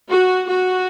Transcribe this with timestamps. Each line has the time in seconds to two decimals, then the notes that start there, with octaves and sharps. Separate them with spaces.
0.10 F#4
0.46 F#4